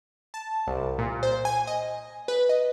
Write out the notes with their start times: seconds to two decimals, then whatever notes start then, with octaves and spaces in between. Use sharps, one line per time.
0.34 A5
0.67 C2
0.99 A#2
1.23 C5
1.45 G#5
1.67 D#5
2.28 B4
2.49 D#5